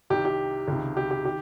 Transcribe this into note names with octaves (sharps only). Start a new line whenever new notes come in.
C2 C3 D#3 G4
G4
C#2 C3 D#3
G4
G4
D#3 G4